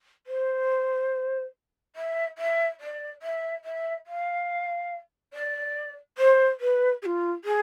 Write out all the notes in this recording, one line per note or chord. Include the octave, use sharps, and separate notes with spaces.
C5
E5
E5
D5
E5
E5
F5
D5
C5
B4
G#4
F4
G#4